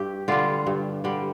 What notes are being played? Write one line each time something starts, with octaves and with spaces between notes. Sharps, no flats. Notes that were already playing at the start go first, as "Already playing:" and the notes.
Already playing: G2 G4
D3 G3 F4
G2
D3 G3